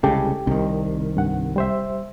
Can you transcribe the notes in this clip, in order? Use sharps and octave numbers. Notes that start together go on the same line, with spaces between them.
C2 C#3 G#3 G4 A4
C2 C3 D#3
G2 F#5
G3 C5 E5